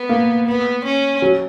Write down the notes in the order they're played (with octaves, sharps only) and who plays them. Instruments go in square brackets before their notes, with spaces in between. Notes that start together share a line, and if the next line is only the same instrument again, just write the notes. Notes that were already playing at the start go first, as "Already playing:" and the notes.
Already playing: [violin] B3
[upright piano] A#3
[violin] B3
C#4
[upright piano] F#3